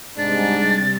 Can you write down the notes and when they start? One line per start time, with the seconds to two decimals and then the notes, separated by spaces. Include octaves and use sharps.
0.18 G#2 C3 G3 D4 A6